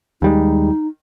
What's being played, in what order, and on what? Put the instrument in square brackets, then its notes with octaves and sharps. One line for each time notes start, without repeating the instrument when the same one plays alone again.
[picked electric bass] D#2 G3 G#3 [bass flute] D#4